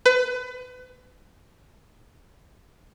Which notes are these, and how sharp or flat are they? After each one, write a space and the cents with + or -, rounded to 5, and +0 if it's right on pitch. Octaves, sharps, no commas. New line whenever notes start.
B4 +30